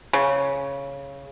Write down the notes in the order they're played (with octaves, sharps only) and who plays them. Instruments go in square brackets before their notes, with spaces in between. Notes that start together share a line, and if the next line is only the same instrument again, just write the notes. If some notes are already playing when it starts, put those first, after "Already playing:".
[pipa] C#3